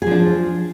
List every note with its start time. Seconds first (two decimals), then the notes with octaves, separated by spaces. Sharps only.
0.02 G#4
0.06 F3
0.11 D4